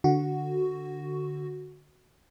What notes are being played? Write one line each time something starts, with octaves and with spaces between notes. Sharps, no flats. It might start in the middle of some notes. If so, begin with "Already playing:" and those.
D3 F#4